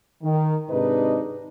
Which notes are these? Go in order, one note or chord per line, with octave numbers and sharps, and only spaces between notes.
D#3
G#2 C3 D4 D#4 B4 D#5